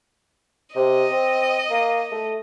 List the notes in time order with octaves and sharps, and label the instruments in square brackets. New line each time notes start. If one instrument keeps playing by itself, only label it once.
[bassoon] C3 [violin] D#5
[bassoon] C4
A#3
A3